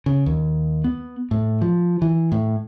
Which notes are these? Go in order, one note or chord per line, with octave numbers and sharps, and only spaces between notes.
C#3
D#2
B3
A2
F3
E3
A2